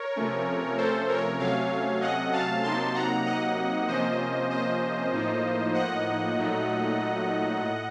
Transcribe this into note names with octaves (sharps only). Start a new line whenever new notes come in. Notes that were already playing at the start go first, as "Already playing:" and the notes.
Already playing: A#4 C#5
C3 F3 A3 C#4
A4 C5
A#4 C#5
C3 F#3 A3 C#4 C#5 F5
D#5 F#5
F5 A5
C3 F#3 A#3 D#4 A5 C6
F#5 A#5
D#5 F#5
C3 F3 A#3 C#4 C5 D#5
C5 D#5
A2 F3 A#3 D#4
D#5 F#5
A#2 F#3 A3 D#4
A2